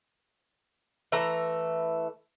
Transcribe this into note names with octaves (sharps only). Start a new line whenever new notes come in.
E3 A3 A#5